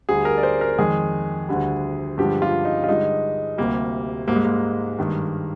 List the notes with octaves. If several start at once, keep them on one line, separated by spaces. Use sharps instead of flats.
D2 D3 G3 G#4
A#4
D5
C5
A#4
F2 D#3 G#3 G#4
D2 D3 G3
G2 D3 F3 G#3 G4
F4
D#4
F4
G2 D3 G#3 D#4
D2 C3 G3 A#3
G#2 G3 A#3
G#3
A#3
G2 D#3 G#3